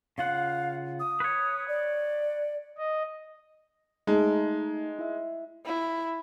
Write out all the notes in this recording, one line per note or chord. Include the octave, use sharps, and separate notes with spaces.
C#3 F4 F5 F#5
D#6
B4 C#5
D5
D#5
G#3 A3 D#4 A5
E4 E5
E4